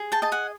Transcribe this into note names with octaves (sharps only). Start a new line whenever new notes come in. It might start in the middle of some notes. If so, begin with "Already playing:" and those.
Already playing: G#4
G5 A5
D#5 A5
F#5 G#5